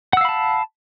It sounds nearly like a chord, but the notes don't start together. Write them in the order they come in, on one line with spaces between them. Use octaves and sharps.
F#5 E6 F5 B5 A5